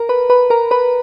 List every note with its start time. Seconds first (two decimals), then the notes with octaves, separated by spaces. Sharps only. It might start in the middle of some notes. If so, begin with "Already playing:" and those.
Already playing: A#4 A#5
0.09 B4 B5
0.30 B4 B5
0.50 A#4 A#5
0.71 B4 B5